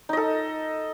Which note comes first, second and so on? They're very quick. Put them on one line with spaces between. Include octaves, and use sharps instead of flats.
D#4 D#5 A4